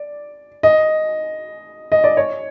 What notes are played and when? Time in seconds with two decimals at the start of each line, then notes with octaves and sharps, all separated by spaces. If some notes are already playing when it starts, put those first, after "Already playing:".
Already playing: D5
0.63 D#5
1.92 D#5
2.04 D5
2.17 C#5